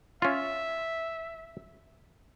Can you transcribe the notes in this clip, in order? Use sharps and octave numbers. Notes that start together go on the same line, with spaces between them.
C#4 F4 E5